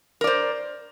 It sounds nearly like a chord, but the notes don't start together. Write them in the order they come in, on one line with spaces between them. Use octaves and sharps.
A#4 D5 C5